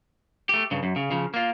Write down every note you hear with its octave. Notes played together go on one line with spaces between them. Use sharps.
A3 G4
G2 C#3
F#2
C#3
C#3 F3
A#3 F4